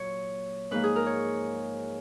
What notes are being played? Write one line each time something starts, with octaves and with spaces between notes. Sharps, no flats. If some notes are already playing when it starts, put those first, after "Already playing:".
Already playing: A#2 F#3 A#3 C#5
G#2 F3 A#3 B4
G#4
A#4
C#5